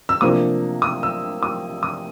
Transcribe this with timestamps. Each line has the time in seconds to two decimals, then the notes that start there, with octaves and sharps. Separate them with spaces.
0.09 E6
0.21 C3 F3 A#3 D4 D#6
0.82 D#6
1.03 E6
1.43 D#6
1.83 D#6